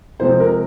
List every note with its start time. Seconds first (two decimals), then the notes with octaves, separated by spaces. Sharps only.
0.19 C3 F3 G#3 C4 C5
0.40 A#4